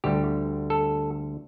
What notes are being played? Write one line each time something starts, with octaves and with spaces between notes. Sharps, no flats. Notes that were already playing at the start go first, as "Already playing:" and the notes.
D2 D3 G3 G4
A4